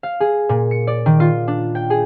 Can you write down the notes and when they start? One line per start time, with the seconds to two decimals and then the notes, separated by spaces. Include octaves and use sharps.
0.03 F5
0.20 G#4
0.49 A#2
0.71 C#7
0.87 D5
1.06 D#3
1.20 F4
1.48 D4
1.75 G5
1.90 G#4